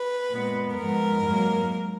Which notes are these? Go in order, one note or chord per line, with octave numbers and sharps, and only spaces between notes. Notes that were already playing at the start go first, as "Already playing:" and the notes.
Already playing: B4
A#2 G#3 B3
G#2 F3 B3 A#4
G#2 F#3 A#3